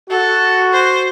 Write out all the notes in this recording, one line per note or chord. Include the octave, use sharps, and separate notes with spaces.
F#4 A4
C5